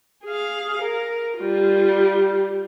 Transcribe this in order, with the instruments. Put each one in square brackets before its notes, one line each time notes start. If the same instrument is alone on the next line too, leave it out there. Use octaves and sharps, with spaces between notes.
[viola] G#4 F5
A#4
G3 F4